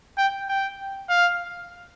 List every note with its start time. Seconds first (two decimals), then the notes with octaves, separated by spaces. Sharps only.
0.18 G5
0.49 G5
1.09 F5